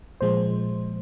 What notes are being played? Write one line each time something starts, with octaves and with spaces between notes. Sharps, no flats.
A#2 F3 G#3 C5